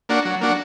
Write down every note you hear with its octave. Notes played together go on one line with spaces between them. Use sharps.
A#3 D4 F#4
F#3
A#3 D4 F#4